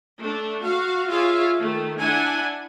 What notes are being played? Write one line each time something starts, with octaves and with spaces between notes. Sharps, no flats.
A3 D4
F#4 F5
F4 G#4 C#5 E5 F5
D#3 A3
D4 E4 F#5 G#5